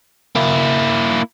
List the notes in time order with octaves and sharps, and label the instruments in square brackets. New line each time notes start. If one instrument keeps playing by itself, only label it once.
[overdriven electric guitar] A#3 E4